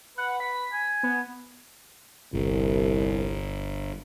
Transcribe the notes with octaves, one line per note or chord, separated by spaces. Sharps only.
B4 F#5
B6
G#5
B3
G1 C2